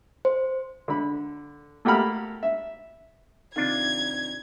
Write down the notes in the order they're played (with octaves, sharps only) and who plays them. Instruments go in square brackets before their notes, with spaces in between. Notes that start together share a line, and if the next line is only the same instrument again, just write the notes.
[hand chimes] C5
[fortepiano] D3 B5
A3 A#3 G4 F#5 B5 F6
E5
[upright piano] C3 D#3 [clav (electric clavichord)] D4 F4 [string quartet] G#6